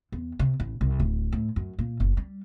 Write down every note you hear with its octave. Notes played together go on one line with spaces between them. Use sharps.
E2
C3
A1
C2
D1
A2
F#2
A#2
F#1
G3